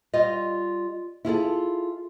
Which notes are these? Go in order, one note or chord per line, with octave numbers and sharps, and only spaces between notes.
G3 F4 D#5
E4 F4 G#4 A4